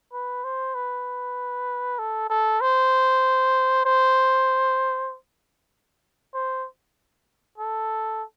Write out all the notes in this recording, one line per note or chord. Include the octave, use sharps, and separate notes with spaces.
B4
C5
B4
A4
A4
C5
C5
C5
A4